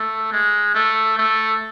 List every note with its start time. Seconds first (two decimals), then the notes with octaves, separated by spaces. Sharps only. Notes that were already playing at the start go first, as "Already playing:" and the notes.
Already playing: A3
0.32 G#3
0.75 A3
1.18 A3